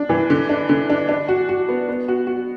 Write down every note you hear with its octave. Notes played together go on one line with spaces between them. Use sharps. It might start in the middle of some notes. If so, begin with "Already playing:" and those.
Already playing: D4
E3
D3
D4
D3
D4
D4
F#4
F#4
B3
B3
F#4
F#4